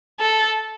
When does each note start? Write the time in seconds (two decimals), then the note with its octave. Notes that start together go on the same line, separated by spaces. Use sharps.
0.20 A4